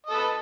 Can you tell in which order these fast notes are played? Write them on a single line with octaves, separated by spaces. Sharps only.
D#5 A4 B4